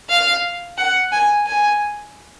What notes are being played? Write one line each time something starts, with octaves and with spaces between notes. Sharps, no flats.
F5
F#5
G#5
G#5